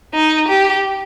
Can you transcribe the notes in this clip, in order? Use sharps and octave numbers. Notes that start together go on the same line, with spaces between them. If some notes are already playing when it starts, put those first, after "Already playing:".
D#4
G4